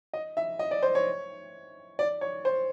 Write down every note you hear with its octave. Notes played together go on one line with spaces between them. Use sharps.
D#5
E5
D#5
D5
C5
C#5
D5
C#5
C5